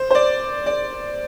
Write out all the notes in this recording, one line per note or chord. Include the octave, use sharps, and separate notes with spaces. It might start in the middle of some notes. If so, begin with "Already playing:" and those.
Already playing: C5
C5
D5
D5